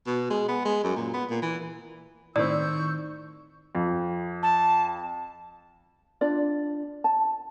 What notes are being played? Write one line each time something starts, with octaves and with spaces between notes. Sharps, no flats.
B2
G#3
B3
G#3
F#2
A#2
B3
A#2
E3
A2 D#3 C4 D5 C#6 E6 G6
F2
A5
D4 F4 D5
A5